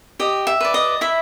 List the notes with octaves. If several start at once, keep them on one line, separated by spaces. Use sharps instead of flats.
G4 D#5
E5
B4 D5
D#5
E4 E5